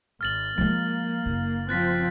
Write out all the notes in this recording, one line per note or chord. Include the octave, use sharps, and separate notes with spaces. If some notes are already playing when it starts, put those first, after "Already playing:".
G#1 F6 A6 F#7
F3 G#3 A#3 A6
F#1
F3 C4 F#6 A6 B6